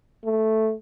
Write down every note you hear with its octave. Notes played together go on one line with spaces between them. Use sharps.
A3